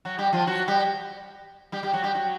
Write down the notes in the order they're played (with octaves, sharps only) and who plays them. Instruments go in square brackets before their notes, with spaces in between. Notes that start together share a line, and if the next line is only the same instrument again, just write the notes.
[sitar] F#3 F#4
G3 G4
F3 F4
F#3 F#4
G3 G4
G3 G4
G3 G4
F#3 F#4
G3 G4
F#3 F#4